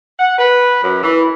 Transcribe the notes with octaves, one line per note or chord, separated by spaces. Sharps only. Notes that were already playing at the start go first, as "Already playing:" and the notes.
F#5
B4
F#2
E3